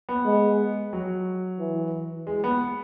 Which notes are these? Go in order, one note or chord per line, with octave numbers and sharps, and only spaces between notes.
B3
G#3
F#3
E3
G#3
B3